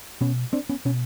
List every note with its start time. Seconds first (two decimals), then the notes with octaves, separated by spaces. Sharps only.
0.21 B2 B3 C#4
0.53 C4 D4
0.69 B3 C#4
0.85 B2 B3 C#4